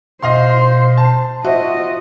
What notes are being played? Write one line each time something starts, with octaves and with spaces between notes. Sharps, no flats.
B2 C5 D#5 F5 C6
A5
F4 F#4 C5 D#5 E5